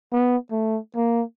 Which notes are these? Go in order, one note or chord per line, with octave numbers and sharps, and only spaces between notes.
B3
A3
A#3